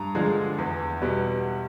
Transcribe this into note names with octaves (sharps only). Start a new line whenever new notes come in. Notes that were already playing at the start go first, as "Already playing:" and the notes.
Already playing: G2 A#5
D3 F3 G#3
E2
B2 G3